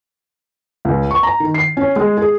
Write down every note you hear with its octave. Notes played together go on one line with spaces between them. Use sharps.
C#2
C#6
A#5
D#3
C7
C#4
G#3
G#4